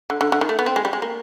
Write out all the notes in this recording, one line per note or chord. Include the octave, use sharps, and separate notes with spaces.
D3
D3
D3
D#3
A3
B3
C4
G#3
G3
G#3
A#3